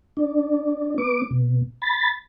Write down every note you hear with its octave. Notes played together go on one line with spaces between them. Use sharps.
D4
B3 D6
B2
B5 A6